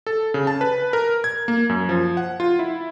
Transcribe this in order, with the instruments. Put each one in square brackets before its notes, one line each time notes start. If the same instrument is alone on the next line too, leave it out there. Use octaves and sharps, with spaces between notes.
[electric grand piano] A4
C#3
A5
B4
A#4
G#6
A#3
F#2
F3
F#5
F4
E4